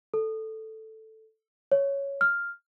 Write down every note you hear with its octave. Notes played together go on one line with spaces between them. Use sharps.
A4
C#5
F6